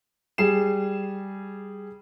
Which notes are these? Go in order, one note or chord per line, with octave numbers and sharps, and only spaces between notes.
G3 G#4 C7 E7